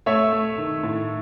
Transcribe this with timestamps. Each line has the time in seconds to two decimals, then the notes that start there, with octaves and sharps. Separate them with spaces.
0.06 A3 C#5 E5
0.32 A3
0.58 D#3
0.83 A2